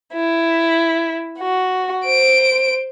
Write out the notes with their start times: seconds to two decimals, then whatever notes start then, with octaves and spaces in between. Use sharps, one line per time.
0.14 E4
1.39 F#4
2.05 C5 D7